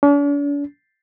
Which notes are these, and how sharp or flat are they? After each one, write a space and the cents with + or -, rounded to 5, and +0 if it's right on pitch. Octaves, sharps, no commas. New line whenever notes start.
D4 -45